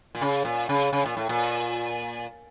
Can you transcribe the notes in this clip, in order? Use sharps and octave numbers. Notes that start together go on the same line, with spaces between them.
A#2
C#3
A#2
C#3
C#3
A#2
A2
A#2